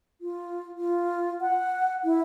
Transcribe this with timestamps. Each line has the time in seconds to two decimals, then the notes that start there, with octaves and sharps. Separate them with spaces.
0.21 F4
0.78 F4
1.41 F#5
2.04 E4